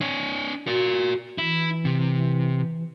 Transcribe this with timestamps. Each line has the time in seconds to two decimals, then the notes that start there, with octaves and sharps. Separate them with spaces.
0.01 D4 C#5
0.67 F#4 A#4 D5
1.38 E3 E4
1.85 C3